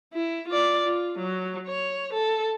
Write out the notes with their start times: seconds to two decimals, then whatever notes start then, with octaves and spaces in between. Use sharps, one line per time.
0.13 E4
0.48 F4 D5
0.85 F4
1.19 F#3
1.67 C#5
2.13 A4